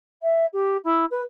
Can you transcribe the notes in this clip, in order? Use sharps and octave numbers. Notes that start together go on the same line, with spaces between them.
E5
G4
E4
B4